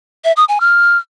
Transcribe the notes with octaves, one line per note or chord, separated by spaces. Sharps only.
E5
D#6
G#5
F6